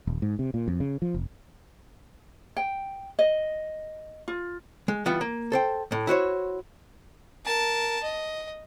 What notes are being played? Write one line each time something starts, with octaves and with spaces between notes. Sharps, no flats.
D#1
G#2
C3
A#2
F2
C#3
F3
F1
G5
D#5
F4
G#3
E3 G3 B3 F4
A#3
A4 C5 G5
A2
E4 F#4 C5 C#5
A#4 A5
D#5